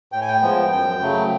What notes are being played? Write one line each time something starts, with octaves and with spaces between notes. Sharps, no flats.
A2 G5
G#5
G5
F3 G#3 B3
F#2 G5
C#3 F#3 A3